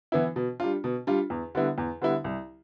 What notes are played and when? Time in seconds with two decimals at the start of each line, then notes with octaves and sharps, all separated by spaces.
0.12 E3 B3 E4
0.36 B2
0.60 G3 D4 F4
0.84 B2
1.07 G3 D4 F4
1.30 E2
1.55 D3 G3 B3 E4
1.78 E2
2.01 D3 G3 B3 E4
2.24 C2